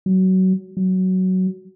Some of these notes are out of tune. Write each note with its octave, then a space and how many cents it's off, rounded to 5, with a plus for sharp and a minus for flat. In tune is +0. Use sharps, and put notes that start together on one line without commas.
F#3 +20
F#3 +10